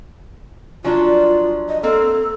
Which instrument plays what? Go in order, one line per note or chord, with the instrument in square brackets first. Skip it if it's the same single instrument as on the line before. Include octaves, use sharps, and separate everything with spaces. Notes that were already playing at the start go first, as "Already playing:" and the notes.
[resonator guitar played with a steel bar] F3 F#3 D4 [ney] F4
[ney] D#5
[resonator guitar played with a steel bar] A#3 C4 [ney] A4